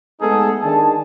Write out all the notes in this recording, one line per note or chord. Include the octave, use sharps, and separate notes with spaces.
G#3 A3 B3 D#4 G#4 A4
D#3 D4 G#4 A5